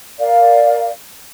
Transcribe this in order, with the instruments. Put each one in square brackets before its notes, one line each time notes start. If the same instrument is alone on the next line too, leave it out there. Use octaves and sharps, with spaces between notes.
[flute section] A#4 D5 F5